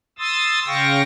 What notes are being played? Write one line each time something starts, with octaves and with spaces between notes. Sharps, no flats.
C6 D#6 E6 A6
C#3 F5 G5 C#6 A#6